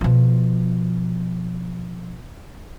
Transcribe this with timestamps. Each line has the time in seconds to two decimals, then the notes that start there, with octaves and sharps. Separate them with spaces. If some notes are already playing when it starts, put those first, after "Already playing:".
0.01 B2 F3